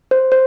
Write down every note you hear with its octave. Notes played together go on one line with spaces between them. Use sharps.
C5
C5